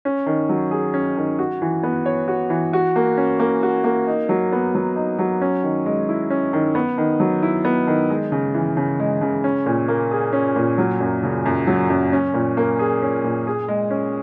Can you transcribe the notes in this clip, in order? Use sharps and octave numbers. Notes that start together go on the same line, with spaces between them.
C#4
D#3
F#3
G#4
C#4
D#3
F#4
E3
B3
C#5
F#4
E3
F#4
A#3
C#4
A#3
F#4
A#3
D#4
F#3
B3
F#3
D#4
F#3
C#4
D#3
G#3
E4
C#4
D#3
B3
D#3
F#3
E4
B3
D#3
G#3
C#3
E3
C#3
G#3
C#3
C#4
A#2
A#3
G#4
C#4
A#2
F#3
F#2
C#3
F#2
F#3
F#2
C#4
A#2
A#3
G#4
C#4
A#2
G#4
G#3
C#4